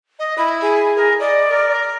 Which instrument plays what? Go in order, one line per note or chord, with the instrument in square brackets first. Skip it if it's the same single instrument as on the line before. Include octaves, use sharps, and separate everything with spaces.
[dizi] D#5
[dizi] E4 [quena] B5
[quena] G#4
[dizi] A#4
[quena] D5 [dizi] D#5
[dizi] A#4